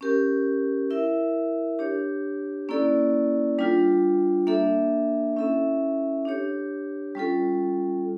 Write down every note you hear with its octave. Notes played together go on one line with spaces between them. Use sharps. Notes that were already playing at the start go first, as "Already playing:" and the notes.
C#4 G4 A#4
E4 A#4 E5
D4 G4 C#5
A#3 C#4 E4 A4 D5
G3 D4 F4
A#3 D4 A4 E5
C#4 E4 A4 E5
D4 G4 C#5
G3 C#4 F4 A4